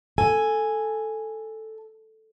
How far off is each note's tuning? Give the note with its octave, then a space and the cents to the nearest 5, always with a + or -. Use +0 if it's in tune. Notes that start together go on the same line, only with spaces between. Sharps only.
A4 +0 G#5 +0